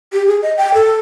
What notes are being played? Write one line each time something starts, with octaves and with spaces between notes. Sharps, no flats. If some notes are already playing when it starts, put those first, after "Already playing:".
G4
G#4
D#5
G5
A4